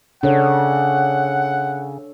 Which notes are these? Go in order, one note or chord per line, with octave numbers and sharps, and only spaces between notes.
C#3 D4 A4 C#5 F#5